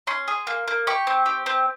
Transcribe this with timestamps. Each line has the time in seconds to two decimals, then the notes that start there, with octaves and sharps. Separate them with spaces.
0.07 C#4 C6
0.28 G#4
0.47 A#3
0.68 A#3
0.87 G4 C#6
1.07 C4
1.26 G4
1.46 C4